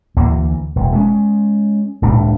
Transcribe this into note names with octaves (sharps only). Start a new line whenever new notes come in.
D2 E3 A#3
E1
G#3 C#4
D#1 C#2 A2 D4